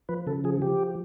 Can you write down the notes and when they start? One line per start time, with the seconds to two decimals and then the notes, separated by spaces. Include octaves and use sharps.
0.09 F3 B4
0.27 C#3 A4
0.44 F3 G#4
0.62 F3 G4